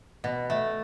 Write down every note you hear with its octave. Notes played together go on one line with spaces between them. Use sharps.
B2
A3